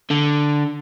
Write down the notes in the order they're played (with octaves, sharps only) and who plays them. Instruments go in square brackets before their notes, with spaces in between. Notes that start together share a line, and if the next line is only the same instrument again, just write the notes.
[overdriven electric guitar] D3